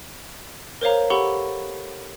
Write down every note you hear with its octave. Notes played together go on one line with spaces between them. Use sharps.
A#4 C5 C#5 F5 A#5
G4 A4 F#5 B5 C#6 G7